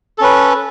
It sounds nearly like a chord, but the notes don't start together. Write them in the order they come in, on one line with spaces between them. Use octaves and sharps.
A4 C#4 B4